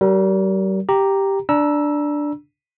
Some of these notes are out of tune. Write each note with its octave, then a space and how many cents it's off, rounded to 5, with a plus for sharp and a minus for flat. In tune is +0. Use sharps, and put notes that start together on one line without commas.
G3 -40 A#4 +0
G4 +0 A#5 +0
D4 +0 A#5 +35 E6 +0